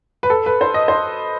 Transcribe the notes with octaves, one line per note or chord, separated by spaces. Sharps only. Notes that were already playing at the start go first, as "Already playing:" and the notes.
B4
A4
B4
C5
D#5
C5